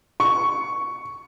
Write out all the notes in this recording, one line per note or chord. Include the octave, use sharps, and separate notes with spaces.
C#6